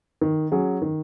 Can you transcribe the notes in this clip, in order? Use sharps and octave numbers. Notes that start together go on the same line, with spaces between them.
D#3
F#3 C#4 G#4
D#3